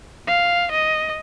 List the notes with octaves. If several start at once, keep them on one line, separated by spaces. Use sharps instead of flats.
F5
D#5